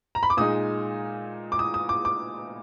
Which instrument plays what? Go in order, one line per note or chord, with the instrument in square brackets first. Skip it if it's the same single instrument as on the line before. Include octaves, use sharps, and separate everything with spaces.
[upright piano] A#5
B5
D6
A#2 G#3 D#4 D#6
D6
D#6
D#6
D6
D6